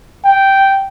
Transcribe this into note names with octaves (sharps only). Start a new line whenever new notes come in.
G5